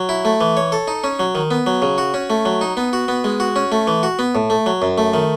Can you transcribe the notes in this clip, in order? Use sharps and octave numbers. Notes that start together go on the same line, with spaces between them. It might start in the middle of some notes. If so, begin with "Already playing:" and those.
Already playing: F#3
E4
A3
E3
C#5
A4
D#4
C#4
F#3
D#3
B3
F#3
C#3
F#4
C#4
A3
F#3
D#4
B3
F#4
B3
G#3
F#4
C#4
A3
E3
F#4
B3
A2
A3
F#3
F#2
A3
D#3